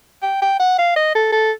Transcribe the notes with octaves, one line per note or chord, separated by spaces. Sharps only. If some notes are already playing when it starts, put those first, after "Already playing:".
G5
G5
F#5
F5
D#5
A4
A4